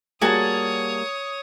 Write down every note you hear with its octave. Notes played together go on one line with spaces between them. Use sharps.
G3 A#3 F#4 G#4 C#5 G#5 A5 D#6